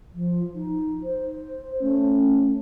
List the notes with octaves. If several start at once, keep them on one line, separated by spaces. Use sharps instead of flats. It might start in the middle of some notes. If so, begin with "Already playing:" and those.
F3
D#4
C5
A3 C#4